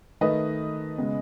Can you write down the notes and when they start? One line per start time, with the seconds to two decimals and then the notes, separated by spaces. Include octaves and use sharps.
0.21 D#3 A3 B4 D#5
0.98 C#3 G#3 B3